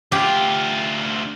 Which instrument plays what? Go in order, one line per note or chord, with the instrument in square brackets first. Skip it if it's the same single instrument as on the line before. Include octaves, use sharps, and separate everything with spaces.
[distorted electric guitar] D2 F4 [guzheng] G4